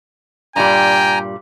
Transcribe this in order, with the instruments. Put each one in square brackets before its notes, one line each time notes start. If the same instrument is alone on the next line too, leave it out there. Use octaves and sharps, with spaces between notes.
[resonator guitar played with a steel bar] G2 A#2 G3 [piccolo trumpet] G5 [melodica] G#5 A#5